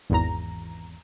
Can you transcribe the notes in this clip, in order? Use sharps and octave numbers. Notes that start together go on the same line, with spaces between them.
G#1 E2 A#5